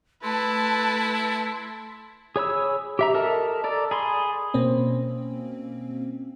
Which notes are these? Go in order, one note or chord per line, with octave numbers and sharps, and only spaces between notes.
A3 E4 A4 B4 A5 C6
G#4 C#5 B5 E6
G4 E5 A#5
A4 A#4 D#5 A5
A4 D5 A#5
G#4 B5 C6
B2 A#3 C4 C#4